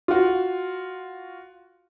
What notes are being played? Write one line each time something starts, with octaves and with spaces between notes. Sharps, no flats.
F4 F#4